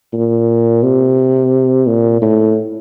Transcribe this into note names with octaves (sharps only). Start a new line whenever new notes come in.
A#2
C3
A#2
A2